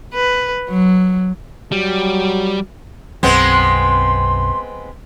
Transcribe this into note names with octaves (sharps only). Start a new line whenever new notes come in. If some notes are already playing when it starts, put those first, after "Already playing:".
B4
F#3
F#3 G3
B1 F#2 F#3 G#3 B3 C4 C6